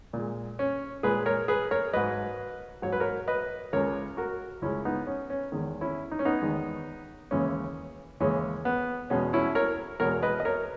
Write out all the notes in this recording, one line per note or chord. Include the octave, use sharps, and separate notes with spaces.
A#2
G#3
C#4
A#2 G#3 G#4 B4
A#4 C#5
G#4 B4
A#4 C#5
G#2 F#3 B4 D#5
G#2 F#3 C#5
B4
A#4 C#5
B4 D#5
C#2 C#3 G#3 A#4 C#5
F#4 A#4
C#2 C#3 G#3 C#4 E4
B3 D#4
C#4
C#4
E2 D#3 G#3
C#4 E4
D#4
C#4
B3 D#4
E2 D#3 G#3
D#2 C#3 E3 G#3 C#4
D#2 C#3 E3 G#3 C#4
B3
E2 B2 G#3 C#4
C#4 E4
A#4 C#5
E2 B2 G#3 A#4 C#5
B4 D#5
D#5
A#4 C#5